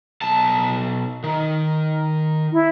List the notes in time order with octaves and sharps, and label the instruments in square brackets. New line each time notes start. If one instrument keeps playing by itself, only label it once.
[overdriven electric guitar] B1 A5
D#3
[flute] E4